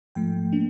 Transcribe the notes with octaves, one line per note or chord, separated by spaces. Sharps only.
G#2 F3 A3 G5
A#3 D4